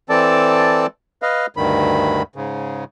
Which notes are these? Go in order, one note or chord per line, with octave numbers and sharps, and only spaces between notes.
E3 C4 A4 D5 A5
B4 D#5 F5
D2 G2 D#3 B5
G#2 C#3